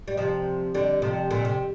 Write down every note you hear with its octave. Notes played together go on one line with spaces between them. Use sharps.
G3
C3 F3
D3 G3
C3 F3
A#2 D3
C3